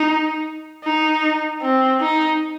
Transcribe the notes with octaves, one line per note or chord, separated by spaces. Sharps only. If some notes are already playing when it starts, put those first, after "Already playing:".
Already playing: D#4
D#4
C4
D#4